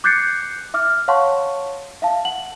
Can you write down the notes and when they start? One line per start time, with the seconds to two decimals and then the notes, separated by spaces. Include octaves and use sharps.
0.04 D6 F#6 G6 A6 C7 C#7
0.74 E5 D6 F6
1.08 C#5 F5 F#5 A5 C6 C#6
2.02 E5 F5 A5
2.25 F#5 F#7